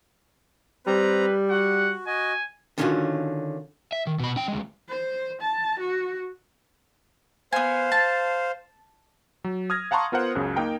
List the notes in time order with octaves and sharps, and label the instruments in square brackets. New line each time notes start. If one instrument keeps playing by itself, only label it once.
[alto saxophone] G3 [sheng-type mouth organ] C4 A#5 [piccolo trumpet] B4
[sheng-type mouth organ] F#4 [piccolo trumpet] F#5
[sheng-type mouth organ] F#4 D#5 [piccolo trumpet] G#5
[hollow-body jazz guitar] D3 D#3 C#4 D4 F4 F#4
[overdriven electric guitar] E5
D#3
B2 B5
C#4 G5
D2 G#3
[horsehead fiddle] C5
A5
F#4
[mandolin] B3 G#5 [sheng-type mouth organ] C5 F5
[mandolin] A5
[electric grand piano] F#3
D#6 F6 G#6 A#6
F5 F#5 A5 A#5 C6 C#6
B3 F4 A#4 C5 F#5
C#2 F#2 C#3
A#3 D#4 A#4 G5 A#5